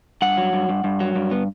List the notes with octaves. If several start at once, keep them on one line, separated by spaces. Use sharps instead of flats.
G2 F#5
F#3
G2
G2
G2
F#3
G2
B3